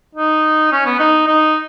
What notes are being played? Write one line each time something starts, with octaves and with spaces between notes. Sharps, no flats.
D#4
C#4
B3
D#4
D#4